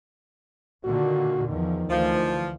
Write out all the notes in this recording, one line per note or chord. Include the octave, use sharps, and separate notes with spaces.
A#2 D3 D#3 F#4
E2 D#3 F3
D2 E3 F3